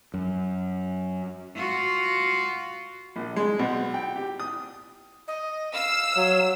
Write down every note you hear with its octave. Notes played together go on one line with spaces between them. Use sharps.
F#2
F4 F#4
A#1
G#3
B1
G5
G4
D#6
D#5
F5 E6
F#3